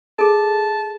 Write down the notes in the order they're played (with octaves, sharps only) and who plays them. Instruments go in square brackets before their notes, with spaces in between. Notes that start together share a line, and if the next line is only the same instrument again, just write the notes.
[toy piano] G#4 A4 [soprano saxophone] A5